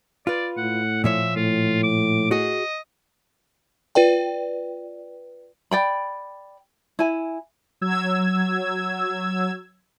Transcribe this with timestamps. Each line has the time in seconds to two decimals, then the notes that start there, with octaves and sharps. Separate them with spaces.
0.27 F4 B4 D5
0.57 A2 F#5
1.04 A#2 F3 C#5 E5
1.36 A2 F4
1.83 D6
2.31 F#4 G#4 D#5
3.95 F4 B4 D5 G5
5.71 D5 G5 B5
6.99 E4 G#5
7.81 F#3 E6 G#6